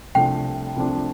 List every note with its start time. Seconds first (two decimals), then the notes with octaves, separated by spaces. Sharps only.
0.15 C2 C3 F3 A3 D4 G5
0.76 C2 C3 F3 A3 D4